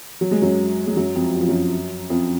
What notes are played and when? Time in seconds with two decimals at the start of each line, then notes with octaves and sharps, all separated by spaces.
0.21 F#3
0.31 G#3
0.42 F#2 F#3
0.87 G#3
0.96 F#2 F#3
1.15 F2 F3
1.34 F#3
1.41 F3
1.48 F#2 F#3
2.10 F2 F3